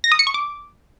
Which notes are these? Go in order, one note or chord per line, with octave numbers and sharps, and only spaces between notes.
A#6
D#6
C#7
C#6
D6